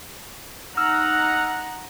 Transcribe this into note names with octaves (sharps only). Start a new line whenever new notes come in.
D#4 F#5 A#5 E6 F6